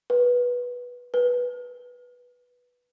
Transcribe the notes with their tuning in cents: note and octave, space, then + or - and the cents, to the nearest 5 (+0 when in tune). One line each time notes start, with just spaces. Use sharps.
B4 -15
B4 -10